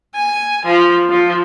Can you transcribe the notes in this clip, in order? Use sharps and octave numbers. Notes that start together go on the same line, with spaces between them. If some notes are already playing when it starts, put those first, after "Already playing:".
G#5
F3
F3